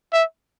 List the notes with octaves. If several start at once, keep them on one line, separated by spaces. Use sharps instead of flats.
E5